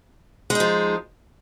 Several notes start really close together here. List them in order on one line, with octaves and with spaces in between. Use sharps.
G#3 D#4 F3